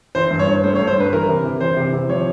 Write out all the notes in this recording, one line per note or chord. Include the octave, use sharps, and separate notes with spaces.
E3 C5
G2
C#5
G2
A3 C5
C#5
G2
C5
G2 B4
E3 A#4
C3
E3
E3 C5
C3
C3
F3 C#5